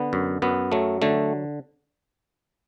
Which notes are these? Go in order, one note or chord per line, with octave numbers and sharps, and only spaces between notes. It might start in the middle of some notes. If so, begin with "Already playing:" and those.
Already playing: D3 B3
F#2
F#2 B3
F#3 A3
D3 A3